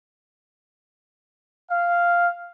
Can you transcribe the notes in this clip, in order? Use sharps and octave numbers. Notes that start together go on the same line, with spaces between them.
F5